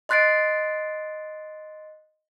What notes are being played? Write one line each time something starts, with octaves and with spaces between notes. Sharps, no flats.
D#5 C6 F#6 A6 C7 D7